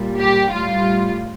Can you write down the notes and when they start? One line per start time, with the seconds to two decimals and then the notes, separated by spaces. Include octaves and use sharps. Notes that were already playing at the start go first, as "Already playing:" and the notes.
Already playing: A#2 G3
0.20 G4
0.53 A2 G3 F4